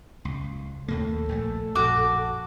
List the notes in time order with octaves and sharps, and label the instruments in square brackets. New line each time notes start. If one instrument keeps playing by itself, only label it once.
[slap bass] C#2
[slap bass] D#2 A2 A#3 [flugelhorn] A4
[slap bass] A#1 F3 A3
[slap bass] A#1 F#2 [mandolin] F#4 D6